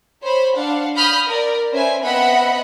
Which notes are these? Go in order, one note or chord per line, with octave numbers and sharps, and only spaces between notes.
C5 C#5 B5
D4 F5 F#5
B5 D#6 F6 G6
A#4 D5
C#4 B4 C5 D5 E5 G#5
B3 C4 D#5 E5 F#5 B5